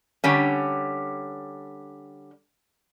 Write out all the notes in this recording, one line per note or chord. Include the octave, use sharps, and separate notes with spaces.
D3 G3 C#4